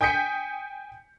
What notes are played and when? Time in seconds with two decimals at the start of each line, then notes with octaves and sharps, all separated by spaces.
0.01 G5 G#5 D#6 G6 B6 C#7